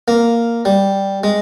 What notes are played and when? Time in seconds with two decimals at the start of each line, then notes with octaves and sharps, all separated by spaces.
0.08 A#3
0.65 G3
1.24 G#3